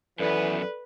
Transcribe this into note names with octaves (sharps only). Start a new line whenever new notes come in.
F#2 E3 B3 A4 B4 D5